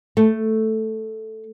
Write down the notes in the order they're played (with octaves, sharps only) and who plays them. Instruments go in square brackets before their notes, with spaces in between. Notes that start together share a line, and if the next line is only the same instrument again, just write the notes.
[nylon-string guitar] A3